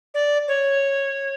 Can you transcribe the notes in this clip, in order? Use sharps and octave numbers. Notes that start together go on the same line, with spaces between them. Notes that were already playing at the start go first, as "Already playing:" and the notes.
D5
C#5